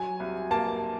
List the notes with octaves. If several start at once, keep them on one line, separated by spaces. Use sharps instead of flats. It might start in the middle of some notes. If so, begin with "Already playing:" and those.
Already playing: F#3 G#5
C2
A#3 A5